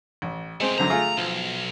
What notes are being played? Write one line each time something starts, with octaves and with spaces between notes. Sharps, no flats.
A1
G#3 A3 C4 G4 C5
F#2 D3 C5 A#5
A3 F4 G#4
B1 F3